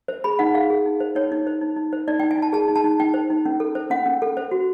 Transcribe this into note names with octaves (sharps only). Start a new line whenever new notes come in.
C5
G#4 B5
D#4 F#5
G#4 F5
G#4
D#4
C5
D#4 C#5
D#4
C5
D#4
D#4
C5
D#4 D5
G5
D#4
G#5
D#4 A5
G#4 A5
D#4
A5
D#4
D#4 G5
C5
D#4
C#4
A4
C5
C#4 F#5
C#4
A4
C5
F#4